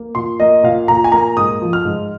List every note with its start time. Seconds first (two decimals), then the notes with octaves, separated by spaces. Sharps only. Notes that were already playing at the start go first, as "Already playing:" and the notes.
Already playing: A#3
0.15 A#2 C6
0.40 A#3 D#5
0.63 A#2 F5
0.88 A#2 A#5
1.04 G#5
1.12 A#3 A#5
1.37 G#2 D#6
1.62 F3
1.73 F6
1.85 G#2